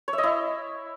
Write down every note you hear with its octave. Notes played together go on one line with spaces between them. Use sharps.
C#5
E5
D#5
E4